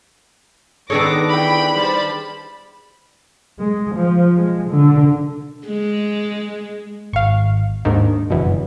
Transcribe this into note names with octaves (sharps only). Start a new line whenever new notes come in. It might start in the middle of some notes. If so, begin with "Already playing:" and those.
D#3 B3 D4 G#4 A4 C#5 D6 A#6
E3 G5 B5
G3 C5 A5
G#3
F3
G#3
D3
G#3
G#1 F5 C#6
D#2 G#2 D#3 D4
F#1 E2 G2 B2 E3